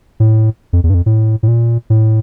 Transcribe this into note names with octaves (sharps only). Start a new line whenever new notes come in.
A2
F2
E2
G2
F2
A2
A2
A#2
A2